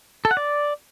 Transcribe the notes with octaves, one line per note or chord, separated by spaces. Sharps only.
A4
F#5
D5